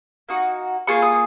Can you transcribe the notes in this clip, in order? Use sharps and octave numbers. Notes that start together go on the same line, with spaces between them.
A#3 D#4 F#4
A#3 F4 G#4 C#6
D#6